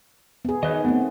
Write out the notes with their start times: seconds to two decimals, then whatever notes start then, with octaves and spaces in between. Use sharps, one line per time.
0.45 B3 G#4
0.63 D#3 B4 C#5 D#5
0.85 A3 B3 C4